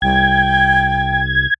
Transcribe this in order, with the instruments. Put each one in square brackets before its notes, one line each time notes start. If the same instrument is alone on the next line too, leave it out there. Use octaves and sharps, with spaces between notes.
[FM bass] C2 [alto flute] G5 [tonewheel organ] G#6